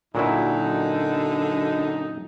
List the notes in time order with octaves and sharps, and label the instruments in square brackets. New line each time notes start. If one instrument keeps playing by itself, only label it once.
[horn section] F#2 D#4 [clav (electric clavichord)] A#2 F#3 E4 [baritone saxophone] D3